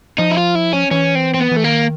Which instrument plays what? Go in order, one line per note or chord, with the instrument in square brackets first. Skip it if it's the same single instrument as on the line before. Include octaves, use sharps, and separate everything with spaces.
[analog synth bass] F3 [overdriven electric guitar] D#4
[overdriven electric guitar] E4
F4
E4
C#4
[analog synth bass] E3 [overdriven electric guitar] C#4
[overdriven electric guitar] C4
C4
B3
[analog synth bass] E3 [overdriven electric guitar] A3
[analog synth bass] D#3 [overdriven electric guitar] A#3